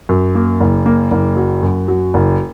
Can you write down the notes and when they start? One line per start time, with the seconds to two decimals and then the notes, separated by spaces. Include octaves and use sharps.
0.09 F#2
0.35 A#3
0.60 F#1
0.86 A#3
1.11 F#1
1.37 F#3
1.63 F#2
1.88 F#3
2.14 F#1